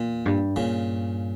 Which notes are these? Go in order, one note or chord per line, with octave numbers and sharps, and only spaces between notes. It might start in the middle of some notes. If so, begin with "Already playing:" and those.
Already playing: E2 A#2
G2
G2 A#2 C#3